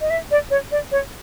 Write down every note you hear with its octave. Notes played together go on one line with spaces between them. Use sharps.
D#5
E5
D5
C#5
D5
C#5